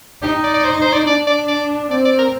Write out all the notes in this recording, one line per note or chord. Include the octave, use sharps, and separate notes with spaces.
D#4 G4
D5
D5
C5
C5
D5
D4 D5
D5
D5
C4 D5
D5
A#4